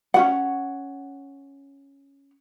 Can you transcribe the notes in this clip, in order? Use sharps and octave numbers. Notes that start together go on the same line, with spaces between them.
C#4 F#4 F#5